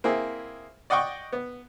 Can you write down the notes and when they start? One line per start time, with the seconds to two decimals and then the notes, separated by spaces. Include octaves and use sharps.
0.04 A#3 C4 E4 G#4
0.90 D5 D#5 F#5 G5 C#6
1.33 B3